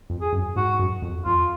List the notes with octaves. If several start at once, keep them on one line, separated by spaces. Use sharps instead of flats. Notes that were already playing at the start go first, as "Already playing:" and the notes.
F2
G#4
F#2
G#2 F#4
F#2
F2
F2 F4